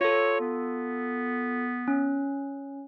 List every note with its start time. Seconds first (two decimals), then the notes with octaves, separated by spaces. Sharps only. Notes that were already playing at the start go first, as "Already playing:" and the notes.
0.01 F4 A4 C#5
0.40 B3
1.88 C#4